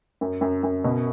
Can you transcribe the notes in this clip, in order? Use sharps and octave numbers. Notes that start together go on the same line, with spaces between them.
F#2
F#2
F#2
B2